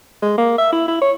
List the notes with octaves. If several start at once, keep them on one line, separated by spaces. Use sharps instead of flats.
G#3
A#3
E5
E4
E4
C#5